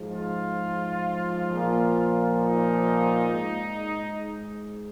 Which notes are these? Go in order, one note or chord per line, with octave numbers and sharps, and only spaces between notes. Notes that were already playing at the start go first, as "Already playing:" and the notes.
Already playing: G#2 F3
F4
A#2 F3
D#4
G#2